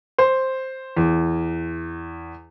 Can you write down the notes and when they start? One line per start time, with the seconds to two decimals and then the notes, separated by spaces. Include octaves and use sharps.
0.18 C5
0.97 E2